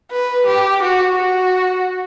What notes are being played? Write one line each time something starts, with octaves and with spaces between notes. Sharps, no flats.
B4
G4
F#4
F#4